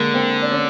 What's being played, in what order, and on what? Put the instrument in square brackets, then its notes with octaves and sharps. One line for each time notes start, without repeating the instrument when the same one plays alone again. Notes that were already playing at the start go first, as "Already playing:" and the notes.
Already playing: [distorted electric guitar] D3 [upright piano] G#3 A#3
[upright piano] A#3 C4
D4
C#4